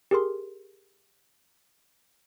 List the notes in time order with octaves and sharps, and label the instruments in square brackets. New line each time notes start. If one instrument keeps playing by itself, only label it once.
[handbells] G4 G#4 A#4 C6